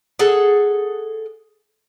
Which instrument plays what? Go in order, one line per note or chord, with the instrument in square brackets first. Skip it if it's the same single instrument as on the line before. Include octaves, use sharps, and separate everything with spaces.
[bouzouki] G#4 A4 F#5